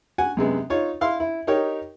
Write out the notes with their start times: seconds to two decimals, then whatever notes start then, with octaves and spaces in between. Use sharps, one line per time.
0.18 F#4 F#5 G#5
0.37 F#2 C3 G#3 B3
0.70 D#4 F4 C#5
1.01 E4 F5 C6
1.20 E4
1.47 D#4 G4 A#4 C#5 D#5 G5